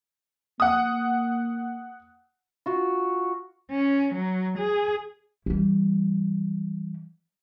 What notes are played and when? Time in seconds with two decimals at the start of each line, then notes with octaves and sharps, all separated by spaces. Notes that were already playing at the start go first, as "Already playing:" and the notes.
0.60 A#3 F#5 D#6
2.66 F4 F#4
3.71 C#4
4.14 F#3
4.58 G#4
5.46 E3 G3